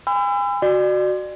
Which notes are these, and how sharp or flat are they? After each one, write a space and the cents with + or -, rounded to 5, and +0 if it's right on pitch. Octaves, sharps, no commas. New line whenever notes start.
G#5 -35 B5 +40 E6 +30
F#4 +0 D5 +30